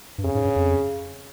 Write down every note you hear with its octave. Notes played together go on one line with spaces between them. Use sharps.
G2
F2 C#3
G#2
G2
F2